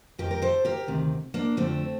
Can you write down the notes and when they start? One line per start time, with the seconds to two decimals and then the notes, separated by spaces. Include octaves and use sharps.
0.18 F2 D#3 G4 A#4
0.31 A#4
0.42 A4 C5
0.65 G4 A#4
0.88 D2 C3 D#3
1.34 A#3 D4
1.57 F2 D3 F3 A3 C4